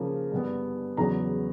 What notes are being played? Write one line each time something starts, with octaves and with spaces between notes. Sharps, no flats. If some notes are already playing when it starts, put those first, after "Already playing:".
Already playing: C#3 F3 A#3
G2 D3 G3 B3
E2 C#3 F#3 B3 A#5